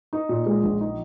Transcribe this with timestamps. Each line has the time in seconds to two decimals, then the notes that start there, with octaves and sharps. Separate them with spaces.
0.13 D#4
0.29 A#2
0.46 G#3
0.63 A#1
0.81 D#4